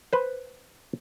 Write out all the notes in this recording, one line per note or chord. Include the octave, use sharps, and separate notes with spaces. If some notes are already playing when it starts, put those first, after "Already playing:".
B4 C5